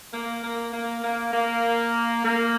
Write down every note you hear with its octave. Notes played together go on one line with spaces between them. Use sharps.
A#3
A#3
A#3
A#3
A#3
A#3